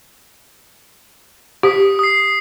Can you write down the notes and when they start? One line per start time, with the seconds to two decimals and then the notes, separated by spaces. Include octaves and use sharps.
1.63 G4 D#6 B6
1.99 D#6 C7